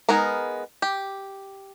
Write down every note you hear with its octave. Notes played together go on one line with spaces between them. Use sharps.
G#3 B3 D#4 A#4 A#5
G4